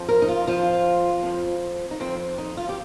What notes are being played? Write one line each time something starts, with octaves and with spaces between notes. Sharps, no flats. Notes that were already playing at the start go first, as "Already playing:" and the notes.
Already playing: F2 F3
A#4
D#4
F4
F2 F3 F4
F2 F3
D#4
F2 F3 C4
D#4
F4
G4